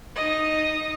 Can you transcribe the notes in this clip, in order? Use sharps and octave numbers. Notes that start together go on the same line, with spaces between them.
D#4 D#5